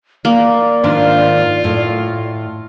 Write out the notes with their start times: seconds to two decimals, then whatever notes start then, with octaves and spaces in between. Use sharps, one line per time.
0.25 A#3 D5
0.83 G#2 D#3 D4 F4
1.64 A2